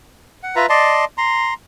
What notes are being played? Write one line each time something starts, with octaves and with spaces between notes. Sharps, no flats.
F#5
F4 B4 E5 A#5
D5 D#5 A5 C6
A#5 C6